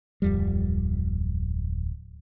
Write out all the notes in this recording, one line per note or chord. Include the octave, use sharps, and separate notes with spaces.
D1 F2 G3